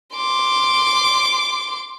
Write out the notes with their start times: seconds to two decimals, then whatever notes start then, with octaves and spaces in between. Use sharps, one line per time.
0.15 C6 D6